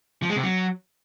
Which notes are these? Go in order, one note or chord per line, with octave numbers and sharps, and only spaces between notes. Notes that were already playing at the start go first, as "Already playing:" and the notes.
F3
G#3
C3
F#3